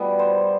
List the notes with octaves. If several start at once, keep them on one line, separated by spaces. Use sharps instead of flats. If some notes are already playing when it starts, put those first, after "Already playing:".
Already playing: B2 G3 B3
C5